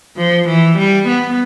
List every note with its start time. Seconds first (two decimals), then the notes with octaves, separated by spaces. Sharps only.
0.17 F3
0.48 E3
0.78 G3
1.08 B3